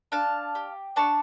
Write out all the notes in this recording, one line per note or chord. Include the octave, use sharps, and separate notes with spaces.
D4 F5 A5
G4
D4 A5 C#6